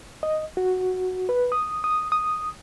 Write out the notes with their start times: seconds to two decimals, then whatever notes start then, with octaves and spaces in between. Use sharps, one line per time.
0.23 D#5
0.57 F#4
1.29 B4
1.52 D#6
1.84 D#6
2.12 D#6